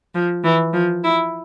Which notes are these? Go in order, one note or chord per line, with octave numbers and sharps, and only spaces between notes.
F3
E3
F3
E4